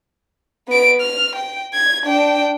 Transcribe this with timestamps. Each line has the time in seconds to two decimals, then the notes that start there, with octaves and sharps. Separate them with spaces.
0.68 B3 D7
1.01 F6
1.36 G5
1.74 G#6
2.04 D4 G5